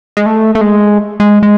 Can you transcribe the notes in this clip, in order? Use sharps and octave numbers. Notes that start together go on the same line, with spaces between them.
G#3
A3
A3
G#3
G#3
G#3